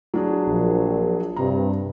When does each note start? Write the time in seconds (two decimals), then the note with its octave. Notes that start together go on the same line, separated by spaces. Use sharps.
0.14 F#3 D4 G#4
0.47 A#1
1.36 G2 C3 A#5